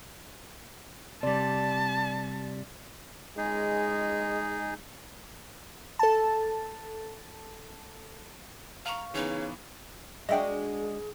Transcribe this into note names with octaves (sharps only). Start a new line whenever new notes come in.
C3 G3 D5 A5
G#3 D#4 G#4
A4 A5
F5 A#5 C#6
C#3 E3 B3 D#4
G#3 D4 F#4 G#4 D#5 E5 G5